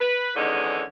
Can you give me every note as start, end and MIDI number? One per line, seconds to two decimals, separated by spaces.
0.01 0.31 71
0.36 0.83 40
0.36 0.83 50
0.36 0.83 51
0.36 0.83 56
0.36 0.83 61
0.36 0.83 63